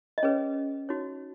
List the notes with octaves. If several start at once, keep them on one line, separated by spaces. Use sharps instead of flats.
D#5
C#4 G#4 B4 C#5
D#4 F#4 C#5